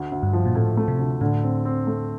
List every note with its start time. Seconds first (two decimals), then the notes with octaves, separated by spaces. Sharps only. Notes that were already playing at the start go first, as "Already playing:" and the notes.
Already playing: D2
0.12 D2
0.23 G2
0.33 F3
0.45 A#2
0.55 A2 A3
0.77 A3
0.88 C3
0.99 D2
1.21 A2 D3
1.43 C4
1.65 C4
1.87 A3